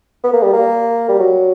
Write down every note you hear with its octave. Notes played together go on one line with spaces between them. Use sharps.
B3
A#3
G3
A#3
G3
F#3